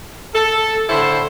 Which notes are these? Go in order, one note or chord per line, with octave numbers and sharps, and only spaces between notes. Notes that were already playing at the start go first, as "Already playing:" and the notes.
A4
A2 D3 E4 A4 C5 B5